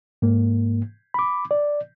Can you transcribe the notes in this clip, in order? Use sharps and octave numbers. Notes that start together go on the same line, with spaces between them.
G#2 A#3
B5 D6
D5